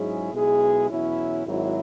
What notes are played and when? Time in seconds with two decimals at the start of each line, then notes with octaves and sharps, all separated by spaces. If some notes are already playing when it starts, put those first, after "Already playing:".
Already playing: G#2 F#3 C#4 E4 G#4
0.33 B1 B2 G#3 E4 G#4
0.90 E2 B2 F#3 C#4 E4
1.46 G#1 G#2 F#3 E4